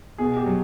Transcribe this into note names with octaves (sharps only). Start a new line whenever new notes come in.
B2 G#4
G4
F#3